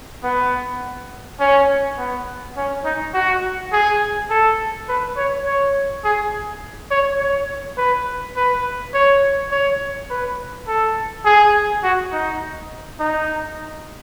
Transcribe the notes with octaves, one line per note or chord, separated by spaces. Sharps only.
B3
C#4
B3
C#4
D#4
F#4
G#4
A4
B4
C#5
C#5
G#4
C#5
C#5
B4
B4
C#5
C#5
B4
A4
G#4
F#4
D#4
D#4